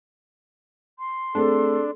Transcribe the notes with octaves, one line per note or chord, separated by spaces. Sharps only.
C6
A3 C4 D4 G#4 A4